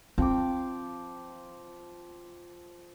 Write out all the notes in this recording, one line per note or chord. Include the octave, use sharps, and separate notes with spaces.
F3 C4 G5 D6